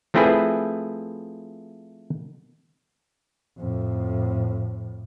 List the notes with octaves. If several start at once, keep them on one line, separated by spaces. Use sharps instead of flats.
F3 A3 C4 E4 G#4 B4
F2 A2